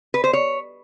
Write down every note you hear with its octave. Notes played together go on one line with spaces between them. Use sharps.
B4
C5
C#5